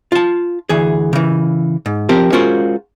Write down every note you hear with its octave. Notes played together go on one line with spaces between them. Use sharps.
F4 A5
D2 E3 G#4
C#3 E3
G#2
F3 C4 G4 A#4
G#3 C#4 F4 F#4 A#4 C5